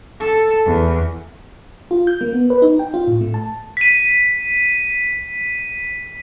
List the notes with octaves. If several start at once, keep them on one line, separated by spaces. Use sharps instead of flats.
A4
E2
F4
G6
A#3
B3
B4
D#4
G5
F4
A2
A3
A5
B6 D#7